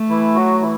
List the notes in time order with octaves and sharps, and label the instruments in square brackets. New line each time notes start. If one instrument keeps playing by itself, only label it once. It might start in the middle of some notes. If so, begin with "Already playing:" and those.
Already playing: [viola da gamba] A3
[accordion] E3 E4
F#3 F#4
E3 E4